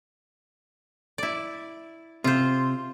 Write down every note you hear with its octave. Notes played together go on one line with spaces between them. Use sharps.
E4 D5
C3 F4 C5